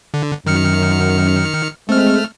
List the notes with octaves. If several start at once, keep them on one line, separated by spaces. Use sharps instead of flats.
D3
F#2 D#3 F6 C#7
G#3 A3 C4 F6